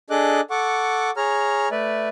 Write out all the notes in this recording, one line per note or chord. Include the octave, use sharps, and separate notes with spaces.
D4 G#4 A4 D#5 D6 F#6
A4 F#5 C#6 D6
G#4 C#5 A#5 F6
A3 B4 D5 E5